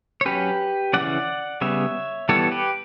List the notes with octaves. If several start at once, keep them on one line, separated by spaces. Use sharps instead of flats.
C#5
F#3 C#4 G4 B4
C#3 E3 G3 C#4 D5 F#5
C#3 G3 B3 C#5 E5
E3 G3 B3 A4 C#5
G4 B4